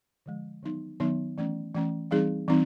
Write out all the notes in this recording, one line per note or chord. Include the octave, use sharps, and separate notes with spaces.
D3 F3 G#3
D#3 F#3 B3 D#4
D#3 F#3 B3 D#4
E3 A3 C#4
E3 A3 C#4
E3 G3 C4 D#4 G#4
E3 G3 C4 D#4